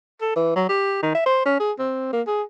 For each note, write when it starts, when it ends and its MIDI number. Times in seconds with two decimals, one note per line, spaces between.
0.21 0.33 69
0.36 0.52 52
0.56 0.66 54
0.69 1.00 67
1.02 1.10 51
1.15 1.25 76
1.26 1.41 72
1.45 1.59 61
1.60 1.72 68
1.79 2.09 60
2.13 2.22 58
2.27 2.42 68